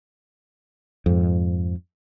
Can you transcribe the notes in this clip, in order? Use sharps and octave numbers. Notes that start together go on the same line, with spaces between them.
F2 G#2